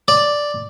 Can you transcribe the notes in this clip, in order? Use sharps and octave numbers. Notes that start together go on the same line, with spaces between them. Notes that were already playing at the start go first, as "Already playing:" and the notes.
D5